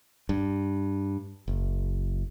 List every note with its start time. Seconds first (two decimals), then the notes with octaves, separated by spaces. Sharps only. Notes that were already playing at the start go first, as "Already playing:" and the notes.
0.29 G2
1.48 F#1